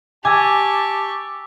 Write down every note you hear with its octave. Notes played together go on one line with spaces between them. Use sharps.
G4 G#5 A5 C#6 D6 E6